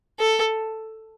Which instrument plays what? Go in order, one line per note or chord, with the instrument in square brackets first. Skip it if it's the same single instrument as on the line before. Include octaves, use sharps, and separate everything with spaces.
[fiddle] A4